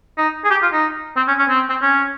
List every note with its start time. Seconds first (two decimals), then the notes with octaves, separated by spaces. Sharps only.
0.18 D#4
0.44 G#4
0.51 G4
0.62 F4
0.73 D#4
1.16 C4
1.28 C#4
1.39 C#4
1.49 C4
1.69 C4
1.82 C#4